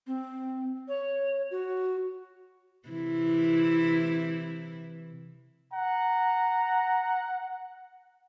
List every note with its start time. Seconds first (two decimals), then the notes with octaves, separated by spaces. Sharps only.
0.07 C4
0.88 C#5
1.51 F#4
2.89 C3 E3 E4
5.73 F#5 A#5